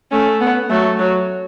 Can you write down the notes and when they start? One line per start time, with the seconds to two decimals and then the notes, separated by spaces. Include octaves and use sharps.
0.11 A3 C#4
0.41 B3
0.70 F#3 A3
0.99 F#3